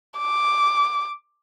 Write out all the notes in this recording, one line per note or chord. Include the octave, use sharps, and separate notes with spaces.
D6